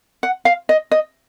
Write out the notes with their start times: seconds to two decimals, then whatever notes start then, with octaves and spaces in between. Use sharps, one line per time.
0.23 F#5
0.45 F5
0.69 D#5
0.91 D#5